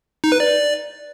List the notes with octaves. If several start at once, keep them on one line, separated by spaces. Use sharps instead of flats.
D#4
B4
D5